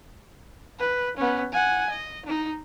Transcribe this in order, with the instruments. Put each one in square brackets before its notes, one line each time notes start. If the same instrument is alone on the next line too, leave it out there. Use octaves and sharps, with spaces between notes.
[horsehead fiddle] B4
B3 C#4
F#5 G#5
D#5
D#4